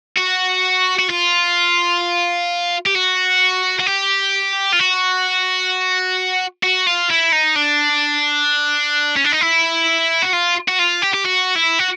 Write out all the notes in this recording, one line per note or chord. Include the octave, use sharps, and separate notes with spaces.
F#4
F#4
F4
G4
F#4
F#4
G4
F4
F#4
F#4
F4
E4
D#4
D4
C#4
D4
D#4
E4
F#4
F4
F#4
F4
G4
G4
F#4
E4
F#4